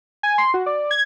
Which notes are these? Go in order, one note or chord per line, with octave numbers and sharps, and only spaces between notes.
G#5
C6
F#4
D5
G#6